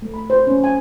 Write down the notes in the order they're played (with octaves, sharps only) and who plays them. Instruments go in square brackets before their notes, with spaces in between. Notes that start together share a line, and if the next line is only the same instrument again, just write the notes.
[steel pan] A3
B5
C5
C#4
G#5